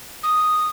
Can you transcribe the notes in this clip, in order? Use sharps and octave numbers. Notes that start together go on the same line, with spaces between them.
D#6